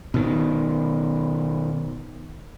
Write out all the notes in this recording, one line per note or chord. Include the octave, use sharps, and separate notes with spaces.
B2 D#3